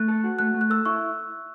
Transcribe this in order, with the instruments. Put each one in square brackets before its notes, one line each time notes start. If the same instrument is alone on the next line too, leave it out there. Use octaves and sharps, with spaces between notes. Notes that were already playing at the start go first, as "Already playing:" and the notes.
Already playing: [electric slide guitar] A3 [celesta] F#6
[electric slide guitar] A4
F#4
[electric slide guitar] A3 [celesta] F#6
[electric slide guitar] A3
[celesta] F#6
[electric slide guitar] A4 [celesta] E6
[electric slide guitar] E4 [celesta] C#6